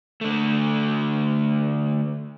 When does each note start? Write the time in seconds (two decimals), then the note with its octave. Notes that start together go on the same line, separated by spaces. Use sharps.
0.21 D3 A3